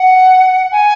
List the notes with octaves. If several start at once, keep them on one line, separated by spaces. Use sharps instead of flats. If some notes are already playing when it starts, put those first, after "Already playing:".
Already playing: F#5
G#5